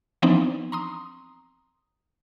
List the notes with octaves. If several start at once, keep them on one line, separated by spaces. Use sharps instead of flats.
E3 F3 B3 C4 D4 D#4
A#5 C6 D#6